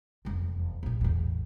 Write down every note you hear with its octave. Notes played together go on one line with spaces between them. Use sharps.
F1 E2
A#1 A#2
A1 E2